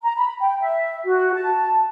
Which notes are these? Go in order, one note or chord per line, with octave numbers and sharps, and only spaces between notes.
A#5
B5
G5
E5
F#4
A5